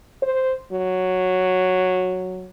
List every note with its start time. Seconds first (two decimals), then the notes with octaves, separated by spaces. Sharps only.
0.22 C5
0.72 F#3